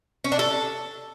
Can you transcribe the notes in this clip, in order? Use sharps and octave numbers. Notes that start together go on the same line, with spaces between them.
C#4
D4
A4